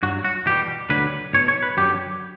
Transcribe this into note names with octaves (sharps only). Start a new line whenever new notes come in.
G2 F#3 F#4
F#4
E2 B2 G3 G4
D2 D3 F#3 B4
B1 B2 F#3 C#5
C#5
B4
F#2 D3 F#3 G4